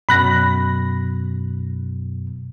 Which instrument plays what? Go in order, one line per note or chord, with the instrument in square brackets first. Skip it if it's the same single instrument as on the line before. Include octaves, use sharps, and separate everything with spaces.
[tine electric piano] F#2 B2 [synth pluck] B5 F#6 A#6